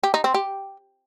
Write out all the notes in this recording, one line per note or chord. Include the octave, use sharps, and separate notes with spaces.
G4
D#4
C4
G4